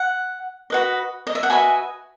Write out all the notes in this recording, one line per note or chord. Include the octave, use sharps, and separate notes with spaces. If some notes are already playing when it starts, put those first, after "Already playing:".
Already playing: F#5
F#4 B4 D#5
D#5
E5
F#5
F#4 B4 D#5 E5 G#5